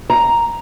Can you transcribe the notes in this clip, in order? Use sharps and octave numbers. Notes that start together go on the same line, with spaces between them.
A#5